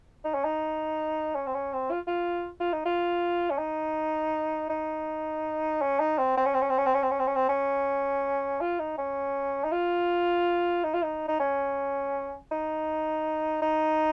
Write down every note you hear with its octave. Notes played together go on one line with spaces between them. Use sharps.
D#4
C#4
D#4
C#4
C4
C#4
C4
F4
F4
F4
D#4
F4
C#4
D#4
D#4
C#4
D#4
C4
C4
C#4
C4
C#4
C4
C#4
C4
C#4
C4
C#4
C4
C#4
C4
C#4
F4
D#4
C#4
D#4
F4
D#4
F4
D#4
D#4
C#4
D#4
D#4